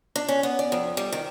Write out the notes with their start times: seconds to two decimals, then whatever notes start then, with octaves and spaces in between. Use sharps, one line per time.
0.16 D4
0.28 C#4
0.43 B3
0.59 D5
0.72 F2
0.97 G3
1.12 D#3